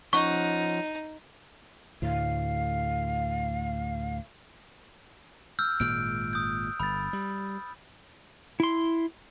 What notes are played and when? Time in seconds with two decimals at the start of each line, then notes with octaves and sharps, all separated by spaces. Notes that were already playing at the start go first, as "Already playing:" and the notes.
0.13 F3 C#4 D#4 F#5 C#6
2.02 D2 A2 F5
5.59 E6 F6 G6
5.80 G#1 A#2 G#3 F6 G6 D7
6.33 D#6 G6
6.80 G1 B5 A6
7.13 G3
8.60 E4 C6